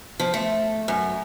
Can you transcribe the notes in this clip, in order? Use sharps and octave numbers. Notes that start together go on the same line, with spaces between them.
F3
A3
F#2